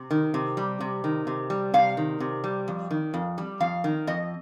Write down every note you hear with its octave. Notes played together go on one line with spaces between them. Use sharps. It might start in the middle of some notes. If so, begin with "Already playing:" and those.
Already playing: C3
D#3
C3
G3
C3
D#3
C3
G3
C3 F5
D#3
C3
G3
F2
D#3
F2
G3
F2 F5
D#3
F2 D#5